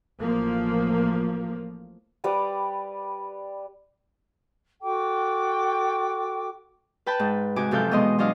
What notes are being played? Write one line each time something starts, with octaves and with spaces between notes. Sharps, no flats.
A1 F3 A#3
G3 B4 D6 D#6
F#4 A4 G5 D6
B4 G5 A5 B5
G#2
C3 G#3 F#4 G#5 D6
F#2 C3 F3 A4 F5 G6
B2 E3 G#3 B3 D#5 C6
F#3 D4 D#5 F5